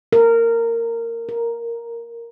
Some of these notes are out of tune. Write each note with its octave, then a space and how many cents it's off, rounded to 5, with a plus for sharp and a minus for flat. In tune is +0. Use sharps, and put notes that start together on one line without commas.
A#4 -15
A#4 +0